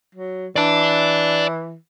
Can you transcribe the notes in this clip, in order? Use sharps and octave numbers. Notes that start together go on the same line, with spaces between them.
F#3
E3 D5 A5